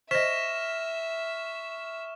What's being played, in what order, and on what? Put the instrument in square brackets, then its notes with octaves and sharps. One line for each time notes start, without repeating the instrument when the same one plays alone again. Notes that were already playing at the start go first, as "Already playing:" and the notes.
[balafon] C5 D#5 [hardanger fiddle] E5 [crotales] C#6 F6 E7 [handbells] A#6 B6